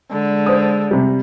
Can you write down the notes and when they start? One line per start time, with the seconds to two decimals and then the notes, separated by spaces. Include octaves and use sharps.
0.11 D3 G#3
0.46 C5 D#6
0.91 C3 G3